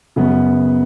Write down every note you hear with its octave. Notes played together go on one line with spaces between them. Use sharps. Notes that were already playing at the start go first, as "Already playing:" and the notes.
F#2 C#3 F#3 B3